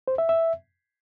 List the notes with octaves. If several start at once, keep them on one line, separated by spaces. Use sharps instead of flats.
C5
E5
E5